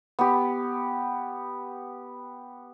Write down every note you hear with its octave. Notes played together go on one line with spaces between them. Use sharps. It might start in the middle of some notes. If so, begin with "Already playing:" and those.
B3 G4